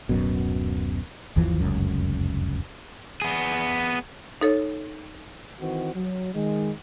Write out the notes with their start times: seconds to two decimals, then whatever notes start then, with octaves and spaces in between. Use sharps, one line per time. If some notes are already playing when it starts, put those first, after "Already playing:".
0.09 D1 F#2 B2
1.36 G1 D#2 E3 F3
1.60 F1 C#2 F#2
3.22 B3 G#4
4.41 D#4 A4 C#5
5.61 D#3 E3 C4 F#4
5.95 F#3
6.34 D#3 G#3